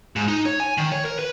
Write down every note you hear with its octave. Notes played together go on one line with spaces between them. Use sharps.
G#2
D#4
C#5
G#5
D#3
C#5
A#4
B4